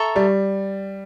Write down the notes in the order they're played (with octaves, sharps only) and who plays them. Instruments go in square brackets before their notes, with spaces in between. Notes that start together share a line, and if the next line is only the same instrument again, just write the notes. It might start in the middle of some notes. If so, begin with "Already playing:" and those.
Already playing: [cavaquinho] A4 E5 A#5 C#6
[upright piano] G3